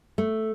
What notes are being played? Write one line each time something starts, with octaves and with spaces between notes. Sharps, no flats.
A3